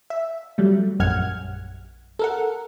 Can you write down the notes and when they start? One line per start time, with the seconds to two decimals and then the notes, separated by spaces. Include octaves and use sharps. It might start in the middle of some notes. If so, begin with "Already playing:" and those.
0.10 E5
0.58 F#3 G3 A3
1.00 A#1 F#2 F#5 F6 G#6
2.19 A4 A#4 F#5